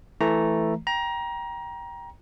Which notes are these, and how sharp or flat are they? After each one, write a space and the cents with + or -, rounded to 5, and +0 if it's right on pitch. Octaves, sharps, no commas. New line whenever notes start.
E3 +0 A3 +0 A#5 +0
G5 +0 A#5 +25